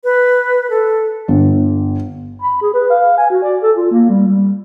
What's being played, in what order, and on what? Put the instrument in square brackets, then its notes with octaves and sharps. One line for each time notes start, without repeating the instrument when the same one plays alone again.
[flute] B4
A4
[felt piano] G1
[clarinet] B5
G#4
B4
F5
G#5
F#4
D5
A4
F4
A#3
G3
G3